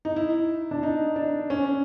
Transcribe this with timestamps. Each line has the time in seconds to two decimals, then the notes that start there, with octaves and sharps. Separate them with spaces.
0.05 D#4
0.16 E4
0.71 D4
0.83 D#4
1.16 D4
1.50 C#4